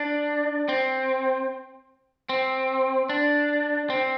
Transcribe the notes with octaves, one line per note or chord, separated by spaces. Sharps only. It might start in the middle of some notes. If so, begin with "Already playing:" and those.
Already playing: D4
C4
C4
D4
C4